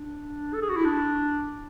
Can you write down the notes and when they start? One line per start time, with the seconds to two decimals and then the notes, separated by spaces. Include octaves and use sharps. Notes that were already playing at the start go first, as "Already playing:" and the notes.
Already playing: D4
0.54 A4
0.62 G#4
0.69 F#4
0.76 E4
0.85 D4